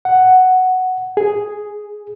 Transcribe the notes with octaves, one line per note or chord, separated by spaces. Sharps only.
F#5
G#4